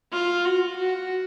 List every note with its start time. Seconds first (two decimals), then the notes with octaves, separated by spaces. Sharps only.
0.13 F4
0.45 F#4
0.78 F#4